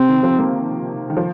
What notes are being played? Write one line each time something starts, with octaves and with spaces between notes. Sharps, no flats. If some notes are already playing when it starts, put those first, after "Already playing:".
Already playing: C3 C4
D#3
F3
A#3
D#3
F3